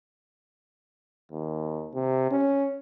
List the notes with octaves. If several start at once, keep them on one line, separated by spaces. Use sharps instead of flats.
D#2
C3
C#4